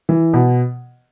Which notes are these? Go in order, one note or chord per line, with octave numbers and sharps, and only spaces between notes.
E3
B2